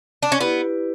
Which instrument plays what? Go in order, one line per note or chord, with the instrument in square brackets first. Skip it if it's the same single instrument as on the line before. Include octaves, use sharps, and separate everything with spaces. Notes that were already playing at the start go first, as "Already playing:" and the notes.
[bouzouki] D4
C#4
[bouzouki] B3 [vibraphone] E4 G4 B4 D5